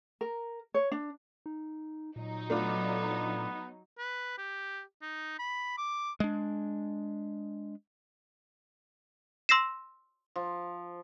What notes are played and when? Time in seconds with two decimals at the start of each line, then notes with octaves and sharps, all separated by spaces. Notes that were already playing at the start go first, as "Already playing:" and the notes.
0.21 A#4
0.74 C#5
0.91 D4
1.46 D#4
2.16 A#2 F#3 D#4
2.50 A3 B3 D4 F4
3.98 B4
4.38 G4
5.02 D#4
5.39 B5
5.78 D6
6.20 G#3 D4
9.49 C6 E6 A#6 C7 E7
10.36 F3